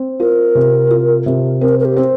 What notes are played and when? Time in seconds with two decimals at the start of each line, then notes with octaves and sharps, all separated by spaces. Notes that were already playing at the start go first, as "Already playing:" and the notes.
Already playing: C4
0.20 F4 A#4
0.55 C3
0.91 F4
1.26 C3
1.61 C4 A#4
1.79 A#4
1.85 G4
1.96 C4